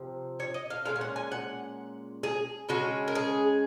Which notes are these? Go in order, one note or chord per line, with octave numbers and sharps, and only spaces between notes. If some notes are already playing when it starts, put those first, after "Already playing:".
Already playing: C3 F3
C#5
D#5
F5
A#2 G#3 C#4 F5
F5
F#5
G#5
F#5
G#4
C#3 G#3 C#4 F#4
A#4
G#4